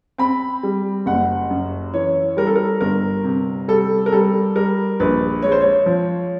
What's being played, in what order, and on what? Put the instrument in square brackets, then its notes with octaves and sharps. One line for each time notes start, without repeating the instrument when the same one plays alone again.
[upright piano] C4 B5
G3
F#1 F#5
F#2
E3 C#5
G3 A#4
A4
A#4
G1 A#4
C3
G3 A4
A#4
G3 A4
G3 A#4
A#1 B4
G#3 C#5
C5
C#5
F3